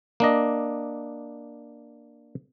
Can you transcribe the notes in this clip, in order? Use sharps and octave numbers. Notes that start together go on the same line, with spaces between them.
A#3 D4 D#5